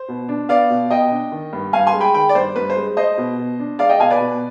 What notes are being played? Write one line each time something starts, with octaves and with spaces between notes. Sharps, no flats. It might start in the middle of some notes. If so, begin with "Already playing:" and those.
Already playing: C5
B2
D4
B3 D5 F5
B2
B2 D#5 G5
D4
D#3
G2
G2 F5 G#5
G#5 C6
G#3
G5 B5
D#3 G5 B5
D5
G2 C5
G2 B4
C5
G#3
G#3 C5 D#5
B2
B2
D4
G#3 D5 F5
D#5 G5
B2 F5 G#5
B4 D5
B2